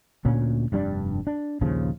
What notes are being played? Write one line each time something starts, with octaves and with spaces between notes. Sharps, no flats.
D2 A#2 C#4
F1 G2 G3 D4
D4
A#1 D#2 C#3 F3